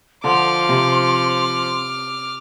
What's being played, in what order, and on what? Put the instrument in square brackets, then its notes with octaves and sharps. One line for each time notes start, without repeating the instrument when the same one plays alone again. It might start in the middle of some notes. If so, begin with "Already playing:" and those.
[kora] D3 [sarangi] F3 [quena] C6 [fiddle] D6 F6
[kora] C3